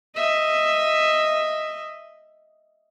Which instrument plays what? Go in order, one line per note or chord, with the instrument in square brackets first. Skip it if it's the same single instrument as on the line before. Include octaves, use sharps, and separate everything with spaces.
[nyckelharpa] D#5 E5